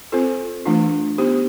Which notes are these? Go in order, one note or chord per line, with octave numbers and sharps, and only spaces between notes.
C4 F4 A4 C5
E3 A3 D4 F4
B3 D#4 G4 C5